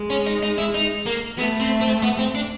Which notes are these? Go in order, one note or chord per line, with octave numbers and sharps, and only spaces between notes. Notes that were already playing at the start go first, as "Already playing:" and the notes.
Already playing: G#3
C#4
D#4
D#4
E4
D#4
A#3
A3 B3
C4
C4
B3
C4
D4